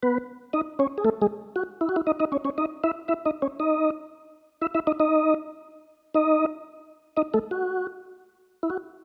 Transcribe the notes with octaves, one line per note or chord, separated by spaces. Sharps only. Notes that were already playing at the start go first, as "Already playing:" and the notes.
B3 B4
D#4 D#5
C#4 C#5
G#4
A3 A4
G#3 G#4
F#4
E4
F#4
E4
D#4 D#5
D#4 D#5
C#4 C#5
C#4 C#5
D#4 D#5
E4 E5
E4 E5
D#4 D#5
C#4 C#5
D#4 D#5
E4 E5
E4 E5
D#4 D#5
D#4 D#5
D#4 D#5
D#4 D#5
A3 A4
F#4
E4
F#4